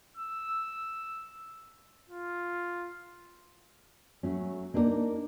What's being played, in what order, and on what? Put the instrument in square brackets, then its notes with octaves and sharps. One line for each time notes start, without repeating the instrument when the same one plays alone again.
[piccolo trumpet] E6
F4
[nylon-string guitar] F#3 A3 C#4
A#3 D4 D#4 G#4 A#4